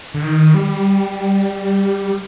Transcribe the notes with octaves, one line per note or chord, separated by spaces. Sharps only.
D3
D#3
G3